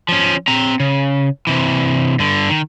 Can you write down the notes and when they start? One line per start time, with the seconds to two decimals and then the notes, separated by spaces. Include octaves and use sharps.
0.09 F3 C#4
0.48 C4 A#5
0.80 C#3
1.47 C3 E3
2.19 G2 D3
2.49 D#3